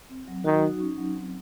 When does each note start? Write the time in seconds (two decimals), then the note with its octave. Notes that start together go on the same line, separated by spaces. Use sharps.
0.09 C4
0.28 F#3
0.45 D#3 F#4
0.62 D#4
0.80 C#4
0.98 F#3
1.16 C4